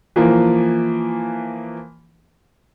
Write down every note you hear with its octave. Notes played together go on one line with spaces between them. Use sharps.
E3 F3 A#3